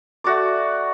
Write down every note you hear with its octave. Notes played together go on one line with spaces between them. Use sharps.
A3 F#4 D5 D6